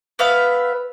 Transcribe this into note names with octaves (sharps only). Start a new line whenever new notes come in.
B3 B4 E5 F5